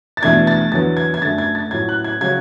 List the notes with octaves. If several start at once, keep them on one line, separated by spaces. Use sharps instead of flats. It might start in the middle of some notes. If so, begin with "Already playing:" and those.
A6
E2 B2 A3 D4 G#6
A6
E2 D3 F#3 B3 A6
G#6
G#6
F#2 D3 A3 A6
G#6
A6
A2 F#3 C#4 G#6
F#6
G#6
C#3 F#3 C#4 G#6